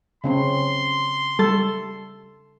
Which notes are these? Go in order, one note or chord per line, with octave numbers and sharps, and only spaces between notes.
C#3 C4 C#4 C6
G3 A4 A6